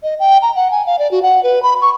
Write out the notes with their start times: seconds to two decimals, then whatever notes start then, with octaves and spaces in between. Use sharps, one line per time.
0.03 D#5
0.19 G5
0.42 A#5
0.55 F#5
0.71 G#5
0.86 F5
0.99 D5
1.11 F#4
1.22 F#5
1.43 B4
1.63 B5
1.81 C#6